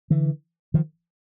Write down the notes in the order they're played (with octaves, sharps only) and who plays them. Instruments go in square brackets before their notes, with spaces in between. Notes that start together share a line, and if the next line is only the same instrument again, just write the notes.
[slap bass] D3 E3
D#3 F3